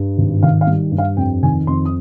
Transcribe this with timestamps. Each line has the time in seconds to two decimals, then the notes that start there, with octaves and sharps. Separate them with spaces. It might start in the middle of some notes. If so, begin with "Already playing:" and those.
Already playing: G2
0.17 G#1
0.43 D#3 F5
0.61 F5
0.67 G3
0.92 G2
0.98 F5
1.17 F2 G5
1.43 D#3 G#5
1.67 F2 C6
1.85 D#6